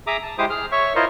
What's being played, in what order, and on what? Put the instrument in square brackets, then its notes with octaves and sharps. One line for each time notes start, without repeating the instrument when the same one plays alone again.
[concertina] G#4 E5 A#5 D6 D#6
A5
G#3 E4 G4 C5 D6 D#6
G#4 F6
C#5 E5 C#6
E4 F4 A#4 C5 D#5